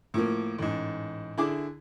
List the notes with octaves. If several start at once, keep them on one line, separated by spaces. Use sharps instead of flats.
A2 F3 A#3
A1 G#2
D3 E4 G#4 D6